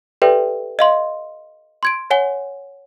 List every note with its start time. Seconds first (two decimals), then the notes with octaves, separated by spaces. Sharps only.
0.22 G4 A4 B4 D5 E5 G5
0.79 D#5 F5 C6
1.83 C6 G#6 D7
2.10 C#5 F#5 G#5 G7